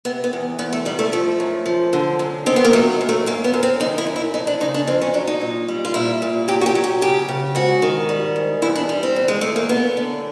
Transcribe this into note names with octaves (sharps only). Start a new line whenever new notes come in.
C3 B3
B3
E2
E2 B3
A3
D#3 G3
A3
F3 A3
F#2
F3
D3
F#2
D#3 C4
B3
A#3
F#3 A3
F#2
A3
F#2 A#3
B3
F#2
C4
D#3 D#4
E4
F#2
E4
F2 D#4
D4
C#3 D#4
D4
F2 C4
C#4
F#3 D4
D#4
A#2
G3
F4
A#2 E4
A#2
F#3 G4
F#4
G4
F#3
G4
C#3 G4
C#3
G#2 F#4
D#3
G3
G#2
E2 E4
D4
G3
C4
E2
G#3
E2 A3
A#3
F#2 B3
D3